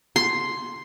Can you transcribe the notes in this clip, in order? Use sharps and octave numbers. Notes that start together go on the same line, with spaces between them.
C6